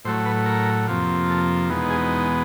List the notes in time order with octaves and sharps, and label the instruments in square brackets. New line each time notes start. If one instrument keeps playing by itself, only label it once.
[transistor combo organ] A2 F#3 A3 C5
B4
A#4
F2 C3 F3 A#3
A4
E2 B2 G#3 B3 D#4
G#4